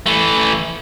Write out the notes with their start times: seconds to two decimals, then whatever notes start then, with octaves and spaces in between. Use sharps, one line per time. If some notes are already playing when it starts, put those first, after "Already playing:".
0.06 E3 A3